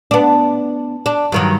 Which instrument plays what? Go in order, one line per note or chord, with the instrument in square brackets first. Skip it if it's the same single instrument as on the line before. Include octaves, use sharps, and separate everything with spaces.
[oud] B3 D4
D4
G2 D#3 F#3